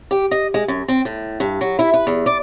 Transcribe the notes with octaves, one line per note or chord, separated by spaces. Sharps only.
G4
D#5
G#3
F#2
C4
A2
G2
F#3
E4
B4
E2
D5